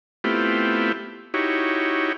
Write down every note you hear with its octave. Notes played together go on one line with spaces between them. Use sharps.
A3 B3 C4 E4 F4 G4
D#4 E4 F#4 G4 C#5